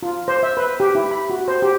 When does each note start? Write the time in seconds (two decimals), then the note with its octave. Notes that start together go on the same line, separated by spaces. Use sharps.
0.03 F4
0.28 C5
0.43 E5
0.57 B4
0.80 G4
0.95 E4
1.11 B5
1.30 F#4
1.48 C5
1.62 G4